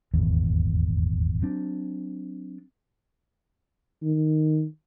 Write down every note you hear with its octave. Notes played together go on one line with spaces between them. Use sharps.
D#1 G#1 E2
F#3 C4 D4
D#3